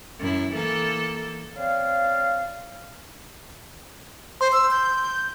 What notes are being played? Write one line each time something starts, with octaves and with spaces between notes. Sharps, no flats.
F#2 E4
E3 A#3 A4
C4 C#5 D5 F5
C5 C6
E6
G6